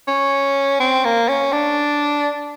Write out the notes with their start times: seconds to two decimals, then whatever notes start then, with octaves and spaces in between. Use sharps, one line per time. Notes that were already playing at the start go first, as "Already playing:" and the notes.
0.08 C#4
0.80 C4
1.05 A#3
1.29 C#4
1.53 D4